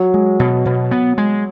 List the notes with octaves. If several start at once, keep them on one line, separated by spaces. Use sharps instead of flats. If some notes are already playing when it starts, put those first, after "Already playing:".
Already playing: F#3
G#3
B2
B2
B3
G#3